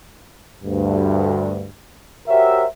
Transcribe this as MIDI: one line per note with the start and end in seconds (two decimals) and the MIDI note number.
0.65 1.68 38
0.65 1.68 43
2.28 2.65 66
2.28 2.65 67
2.28 2.65 70
2.28 2.65 72
2.28 2.65 73
2.28 2.65 76